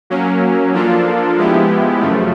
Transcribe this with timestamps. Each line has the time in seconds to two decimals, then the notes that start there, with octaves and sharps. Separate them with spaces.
0.10 F#3 A#3 C#4
0.73 F3 A#3 D4 F4 A4
1.36 F3 G#3 B3 E4 G4
2.00 F#2 C#3 F3 A3